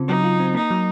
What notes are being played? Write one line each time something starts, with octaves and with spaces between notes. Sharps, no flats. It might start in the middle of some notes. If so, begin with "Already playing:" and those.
Already playing: C#3 C4 F4
F#3 D#4
F4
C4
A#3 D#4
F#3